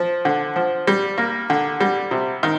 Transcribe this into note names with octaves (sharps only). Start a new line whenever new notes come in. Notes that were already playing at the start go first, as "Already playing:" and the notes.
Already playing: F3
D3
F3
G3
A#3
D3
G3
C3
D#3